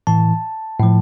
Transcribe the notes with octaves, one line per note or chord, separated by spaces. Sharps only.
A2 E3 A5
A2 F3